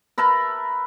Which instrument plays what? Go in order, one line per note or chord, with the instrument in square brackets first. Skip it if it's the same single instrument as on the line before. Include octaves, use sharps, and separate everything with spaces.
[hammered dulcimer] A#4 B4 E5 A5